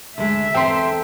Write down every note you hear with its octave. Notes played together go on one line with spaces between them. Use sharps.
D2 G#3 E5
E2 C4 A4 C5 G5 A#5 C6